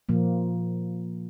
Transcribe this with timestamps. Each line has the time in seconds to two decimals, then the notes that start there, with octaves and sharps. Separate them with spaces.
0.09 A#2 F3 A#3